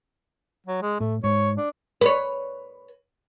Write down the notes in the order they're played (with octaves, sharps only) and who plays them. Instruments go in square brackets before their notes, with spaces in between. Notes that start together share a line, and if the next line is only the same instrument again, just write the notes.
[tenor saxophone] F#3
G#3
[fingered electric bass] A2 [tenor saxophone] A3
[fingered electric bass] G#2 [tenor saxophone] C#5
[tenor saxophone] D4
[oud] B4 C#5